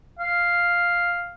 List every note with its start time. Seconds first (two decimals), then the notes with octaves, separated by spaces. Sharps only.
0.19 F5